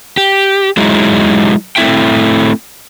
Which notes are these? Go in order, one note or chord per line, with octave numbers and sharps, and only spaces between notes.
G4
F#3 G#3 D#4 E4
A3 C4 E4 E5 G5